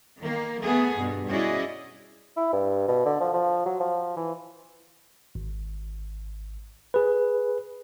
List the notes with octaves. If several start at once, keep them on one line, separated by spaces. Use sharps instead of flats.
D#3 A#3
A3 B3 G#4
G2 B2
C#4 E4 F#4 G#4 D5 D#5
E4
G2
B2
D3
F3
F3
F#3
F3
E3
G#1
G#4 B4